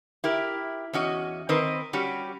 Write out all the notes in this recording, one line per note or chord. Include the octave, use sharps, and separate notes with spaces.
E4 G4 A#4
E2 C#4 F#4 D#5
D#3 C4 A#4 B4 D#5
G3 C#4 F#4 G4